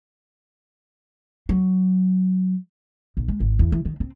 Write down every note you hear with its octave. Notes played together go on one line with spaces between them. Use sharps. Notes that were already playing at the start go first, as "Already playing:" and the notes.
F#3
A#1
G#3
G#1
E2
E3
D#3
C4